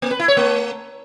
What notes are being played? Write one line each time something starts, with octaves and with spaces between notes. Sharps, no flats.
A#3
B4
E4
C#5
A3